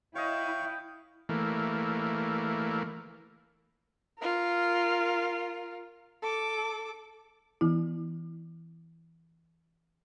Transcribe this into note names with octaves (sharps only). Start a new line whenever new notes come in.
E4 C#5 D#5 F5 G5 C#6
E3 A3 A#3
F4 A#4
A4 D6
E3 B3 E4